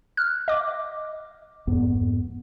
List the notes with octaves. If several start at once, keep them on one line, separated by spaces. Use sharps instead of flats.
F6 F#6
D#5 D6
F2 G#2 B3